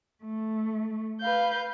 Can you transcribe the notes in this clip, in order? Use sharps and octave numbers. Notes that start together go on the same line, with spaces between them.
A3
B4 F5 G6